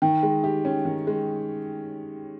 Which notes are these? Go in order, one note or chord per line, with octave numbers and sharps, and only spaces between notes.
D#3 G5
G#3
G4
C#4
D#3
G#3